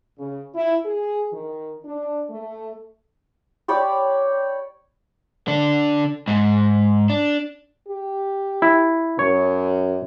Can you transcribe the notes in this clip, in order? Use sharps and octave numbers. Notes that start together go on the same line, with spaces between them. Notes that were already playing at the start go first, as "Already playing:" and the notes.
C#3
E4
G#4
D#3
D4
A3
G4 C#5 D5 B5
D3 D4
G#2
D4
G4
E4
F#2 C#5